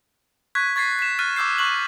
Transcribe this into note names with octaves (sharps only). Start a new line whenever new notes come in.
C#6 F#6 G#6 B6
C#6 G#6 A6 B6 C7
B6 E7
F6 F#6 A6 D#7
C#6 D6 E6 G6 C7
C#6 F#6 F#7